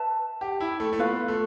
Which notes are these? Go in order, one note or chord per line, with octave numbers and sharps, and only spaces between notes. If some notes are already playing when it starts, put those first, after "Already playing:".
Already playing: B4 E5 A5
G4
E4
A3
A3
B3 F4 B4 F5
A3